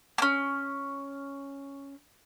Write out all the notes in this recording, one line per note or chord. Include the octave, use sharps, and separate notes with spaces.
A#3 C#4